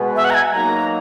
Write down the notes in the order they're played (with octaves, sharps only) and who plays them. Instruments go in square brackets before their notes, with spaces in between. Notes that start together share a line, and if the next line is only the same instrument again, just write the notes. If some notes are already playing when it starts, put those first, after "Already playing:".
Already playing: [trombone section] B2 G#3 B3
[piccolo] E5
F#5
A#5
G#5
[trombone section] F#3 A#3 D#4 A#4 [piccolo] A#5